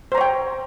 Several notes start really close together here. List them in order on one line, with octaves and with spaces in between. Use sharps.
C5 A#5 C#5 G5